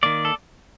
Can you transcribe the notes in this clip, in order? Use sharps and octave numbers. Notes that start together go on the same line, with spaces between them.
D#3 A#3 D5
A4